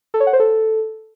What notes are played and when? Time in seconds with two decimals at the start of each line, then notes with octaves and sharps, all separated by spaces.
0.14 A4
0.20 C#5
0.27 F#5
0.33 C5
0.40 A4